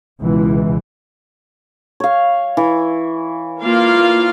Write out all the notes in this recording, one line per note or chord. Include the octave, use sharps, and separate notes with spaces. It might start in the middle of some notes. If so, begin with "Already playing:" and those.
C#2 B2 E3
C#5 F5
E3
A#3 F4 F5